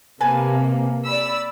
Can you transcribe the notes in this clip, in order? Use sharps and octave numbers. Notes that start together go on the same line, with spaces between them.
C3 A#3 B4 G#5 A5
D5 B5 E6